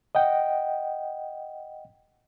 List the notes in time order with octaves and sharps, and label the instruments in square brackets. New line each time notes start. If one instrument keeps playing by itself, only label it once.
[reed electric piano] D#5 F#5 G5